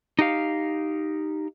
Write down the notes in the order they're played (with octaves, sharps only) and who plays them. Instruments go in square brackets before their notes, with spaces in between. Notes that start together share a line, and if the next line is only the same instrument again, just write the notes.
[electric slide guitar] D#4 G4 F5